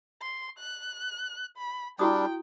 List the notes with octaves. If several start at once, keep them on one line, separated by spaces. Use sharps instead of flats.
C6
F#6
B5
G3 D4 E4 F#4 G5 D#6